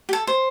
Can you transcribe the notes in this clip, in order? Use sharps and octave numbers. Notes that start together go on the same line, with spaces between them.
G4
A4
C5